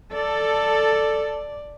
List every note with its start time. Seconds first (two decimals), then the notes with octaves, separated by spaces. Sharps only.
0.13 A4 D5